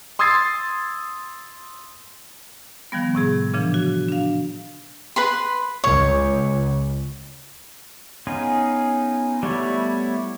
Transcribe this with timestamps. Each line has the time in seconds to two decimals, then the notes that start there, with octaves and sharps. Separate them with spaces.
0.19 C6 D#6 E6 G#6 A6 C7
2.92 D#3 F3 G3 B3
3.15 A2 C3 G#4
3.54 A#2 C#3 E3 F3 D4
3.74 F#4
4.08 D4 F5
5.16 B4 B5 C6
5.84 C#2 C#5
8.27 B3 C#4 D#4 F4 G#4
9.43 G3 A3 B3 E4 C#5